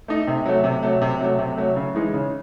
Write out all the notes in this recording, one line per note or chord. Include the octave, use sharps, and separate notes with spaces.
A3 D#4
C3
F#3 A3
C3
F#3 A3
C3
F#3 A3
C3
F#3 A3
C#3
E3 G#3 D#4
C#3